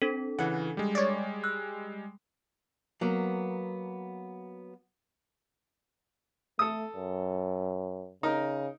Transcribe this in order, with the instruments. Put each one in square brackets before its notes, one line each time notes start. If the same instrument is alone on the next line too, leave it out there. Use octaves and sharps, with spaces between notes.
[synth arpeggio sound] C4 [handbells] D4 A4
[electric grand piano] C#3 E3 [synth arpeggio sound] F#5
[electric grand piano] G3 G#3
[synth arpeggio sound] C#5 D5
[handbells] E6 F#6
[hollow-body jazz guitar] F#3 A#3 B3
[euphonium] A3 [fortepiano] A4 D#6
[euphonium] F#2
[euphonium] C#3 [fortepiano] D#4 A#4